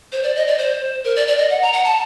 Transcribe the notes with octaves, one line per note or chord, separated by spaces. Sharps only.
C5
D5
D#5
D5
C5
A#4
D5
D5
D#5
F#5
A#5
F#5
A5